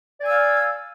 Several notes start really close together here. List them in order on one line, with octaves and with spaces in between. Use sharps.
D5 G#5 E6 F5